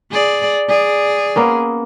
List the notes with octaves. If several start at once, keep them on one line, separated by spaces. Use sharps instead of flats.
G#4 D5
G#4 D5
A#3 B3 C#4